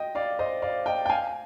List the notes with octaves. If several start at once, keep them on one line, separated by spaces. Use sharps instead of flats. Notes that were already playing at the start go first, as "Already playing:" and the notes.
Already playing: D#5 G5
D5 F5
C5 D#5
D5 F5
D#5 G5
G5
F5 G#5